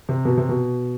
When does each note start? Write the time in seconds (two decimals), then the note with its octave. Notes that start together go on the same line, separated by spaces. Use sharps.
0.09 C3
0.25 B2
0.37 C3
0.49 B2